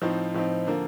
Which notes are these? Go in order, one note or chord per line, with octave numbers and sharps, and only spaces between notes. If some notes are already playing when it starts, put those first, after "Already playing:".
A2 F3 C4 D#4
A2 F3 C4 D#4
D3 F3 A#3